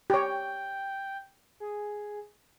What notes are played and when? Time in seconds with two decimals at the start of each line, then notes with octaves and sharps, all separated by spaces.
0.10 G4 C#5 G5
1.60 G#4